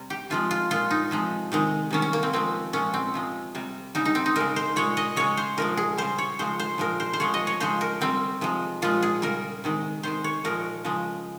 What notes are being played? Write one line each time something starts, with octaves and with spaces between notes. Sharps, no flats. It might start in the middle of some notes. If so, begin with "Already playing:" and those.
Already playing: C3 G3
G4
C3 F3 G#3 F4
F4
A#2 G#3 F4
D#4
C3 F3 G#3
C3 D#3 G#3
C3 D#3 G3 C#4
C#4
A#3
C4
C3 F3 G#3 C4
A#2 F3 G#3 C#4
C4
C3 F3 G#3
C3 G3
C#3 G3 D#4
D#4
C4
D#4
C#3 G#3 A#4
C5
A#2 G#3 C#5
D#5
C#3 G#3 C#5
C5
A#2 F3 G#3 A#4
G#4
C#3 G3 C5
C#5
C#3 F3 G#3 C5
C5
A#2 F3 G#3 A#4
C5
C5
C3 F3 G#3 C#5
D#5
C#5
C#3 F3 G#3 C5
A#4
C3 G3 C4
C3 F3 G#3
A#2 F3 G#3 F4
G#4
C#3 G3 A#4
C3 D#3 G#3
C3 D#3 G#3 C5
C#5
A#2 F3 G#3 A#4
C#3 F3 G#3